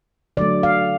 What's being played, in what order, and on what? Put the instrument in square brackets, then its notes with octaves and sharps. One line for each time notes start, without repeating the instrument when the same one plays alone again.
[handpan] D3 F#3 A3 D5
F5